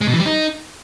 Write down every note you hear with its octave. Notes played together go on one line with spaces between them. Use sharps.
G#3
B2
E3
G3
D#4